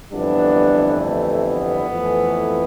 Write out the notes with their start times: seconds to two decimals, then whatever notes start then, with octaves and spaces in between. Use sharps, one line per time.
0.12 G1 F2 E3 G3 B3 D4
1.00 A3
1.44 B3
1.89 F2 E3 A3